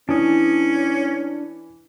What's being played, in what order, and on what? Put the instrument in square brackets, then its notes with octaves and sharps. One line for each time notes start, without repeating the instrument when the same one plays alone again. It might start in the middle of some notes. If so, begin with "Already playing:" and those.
[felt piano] E3 [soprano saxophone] C#4 [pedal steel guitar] D4 D#6